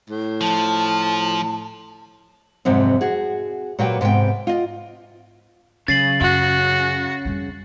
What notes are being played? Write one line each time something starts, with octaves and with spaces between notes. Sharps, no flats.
A2
F3 A5
F2 G#2 C3 F#3 C4
F#4 G#4
A#2 F#3 F#4 G4 B4 G5
G#2 C3 B3 G5
F4 D#5
C#3 F#3 A6 C7 F#7
F#2 F#4
F2 G3